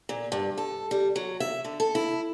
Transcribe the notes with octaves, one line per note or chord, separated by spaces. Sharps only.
A#2
G2
A4
G3
F#3
E5
D3
A4
E4